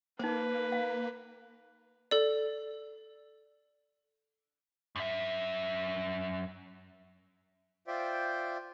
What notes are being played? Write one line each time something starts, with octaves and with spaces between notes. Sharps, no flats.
A#3 D#4 B4 C5
F5
A4 D5
F#2 E5
F4 C5 D5 E5 G5